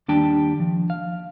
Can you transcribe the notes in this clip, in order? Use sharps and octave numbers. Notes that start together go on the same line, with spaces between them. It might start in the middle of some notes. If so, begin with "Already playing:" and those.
D#2 G3 D4 G5 A5
F3
F5